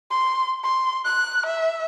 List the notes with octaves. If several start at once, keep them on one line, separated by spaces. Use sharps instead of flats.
C6
C6
F#6
E5